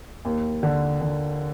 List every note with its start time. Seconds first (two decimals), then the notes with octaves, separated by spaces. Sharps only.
0.25 D#2
0.63 D3
1.01 D3